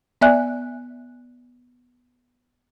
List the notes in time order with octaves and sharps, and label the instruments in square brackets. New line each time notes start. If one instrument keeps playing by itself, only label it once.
[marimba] B3 D5 E5 G#5 F#6